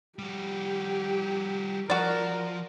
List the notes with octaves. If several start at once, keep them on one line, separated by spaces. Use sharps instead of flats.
G3 F#4 G4
F3 F#4 A#4 D5